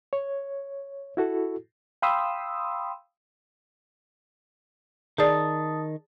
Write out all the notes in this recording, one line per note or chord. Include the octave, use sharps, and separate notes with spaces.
C#5
E4 F#4 A4
F5 G5 B5 C6 D#6 E6
D#3 G#4 D5 A5 D#6 A6